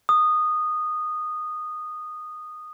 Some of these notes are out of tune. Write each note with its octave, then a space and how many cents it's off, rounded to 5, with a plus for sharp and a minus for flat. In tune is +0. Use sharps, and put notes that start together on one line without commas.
D#6 -15